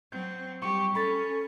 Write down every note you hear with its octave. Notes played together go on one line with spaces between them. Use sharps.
F#3 C4 G6
G3 G4 C#6
C#4 A4 B5 A6